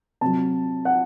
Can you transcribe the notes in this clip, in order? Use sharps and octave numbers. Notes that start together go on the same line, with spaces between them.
C3 F#3 A5
F#5